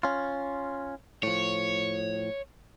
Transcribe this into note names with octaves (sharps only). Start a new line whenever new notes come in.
C#4 F4
A2 F3 C#5